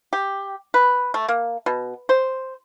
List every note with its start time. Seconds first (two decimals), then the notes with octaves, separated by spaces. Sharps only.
0.13 G4
0.74 B4
1.14 A3
1.29 A#3
1.66 B2
2.09 C5